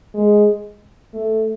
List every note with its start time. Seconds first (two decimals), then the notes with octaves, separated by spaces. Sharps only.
0.14 G#3
1.14 A3